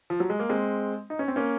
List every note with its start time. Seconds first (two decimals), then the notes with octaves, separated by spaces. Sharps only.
0.10 F3
0.20 F#3
0.30 G#3
0.39 A#3
0.49 G#3 C4
1.10 D#4
1.19 C#4
1.28 C4
1.36 A#3 C#4